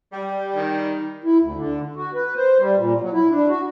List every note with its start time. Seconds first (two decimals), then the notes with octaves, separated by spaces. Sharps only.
0.12 G3
0.55 D#3
1.24 E4
1.40 D2
1.55 D3
1.96 F#4
2.14 B4
2.36 C5
2.59 G3
2.77 A#2
3.01 F#3
3.13 E4
3.30 D4
3.49 F#4